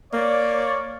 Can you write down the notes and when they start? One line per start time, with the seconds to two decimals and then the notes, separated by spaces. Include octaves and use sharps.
0.13 A#3 C#5 D5